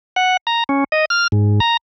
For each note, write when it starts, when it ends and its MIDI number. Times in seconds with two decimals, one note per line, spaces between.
0.16 0.37 78
0.47 0.64 82
0.69 0.84 61
0.92 1.05 75
1.10 1.27 89
1.32 1.60 44
1.60 1.77 82